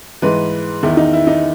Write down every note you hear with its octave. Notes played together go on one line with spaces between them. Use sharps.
G#2 E3 B4
E2 D#3 E4
D#4
E4
D#4